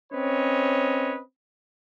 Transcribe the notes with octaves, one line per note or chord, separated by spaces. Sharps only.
C4 C#4 B4 C#5 D#5